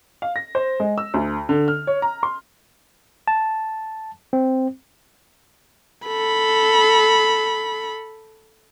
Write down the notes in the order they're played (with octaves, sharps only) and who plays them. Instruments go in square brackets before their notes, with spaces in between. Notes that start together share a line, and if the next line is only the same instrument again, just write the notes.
[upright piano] F5
A#6
C5
G#3
E6
D2
D3
F6
C#5
A#5
C6
[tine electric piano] A5
C4
[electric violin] A4 B5